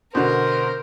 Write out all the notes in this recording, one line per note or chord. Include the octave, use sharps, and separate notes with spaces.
B2 D3 A#4 C5